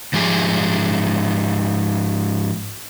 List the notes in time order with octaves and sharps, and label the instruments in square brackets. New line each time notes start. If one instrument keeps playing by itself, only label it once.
[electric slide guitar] G#2 F3 G4 G#4